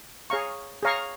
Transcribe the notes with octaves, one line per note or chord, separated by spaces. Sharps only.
G#4 C#5 F5 A#5 C#6
G#4 C#5 F5 A#5 C#6